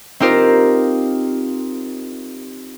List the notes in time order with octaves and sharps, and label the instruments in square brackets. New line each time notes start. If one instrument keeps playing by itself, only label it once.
[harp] C4 D#4 F4 G4 A#4 C5